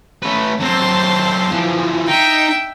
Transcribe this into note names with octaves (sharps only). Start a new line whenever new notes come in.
A3 C#4 B4
F#3 C4 C5 A5
E3 F3
D#4 E5 G5